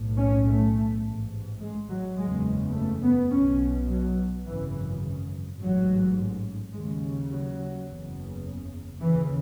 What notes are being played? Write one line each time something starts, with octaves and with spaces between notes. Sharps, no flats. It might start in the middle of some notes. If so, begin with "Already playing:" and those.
Already playing: B1 A2
C#4
A3
A1 G#2
G#3
F#3
F#1 E2 C#3 G#3
A3
B3
B1 B2 C#4
F#3
G#1 F#2 C#3 E3
A1 G#2 F#3
D#2 C#3 G#3
F#3
F#1 E2 C#3
D#2 C#3 E3